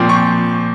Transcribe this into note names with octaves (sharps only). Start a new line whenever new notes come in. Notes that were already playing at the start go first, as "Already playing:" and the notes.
Already playing: A#2 F3 C4
C#6